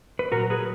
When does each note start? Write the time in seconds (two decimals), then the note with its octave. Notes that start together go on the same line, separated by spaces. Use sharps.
0.19 B4
0.32 A#2 F#3 F#4 A#4
0.50 G#4 B4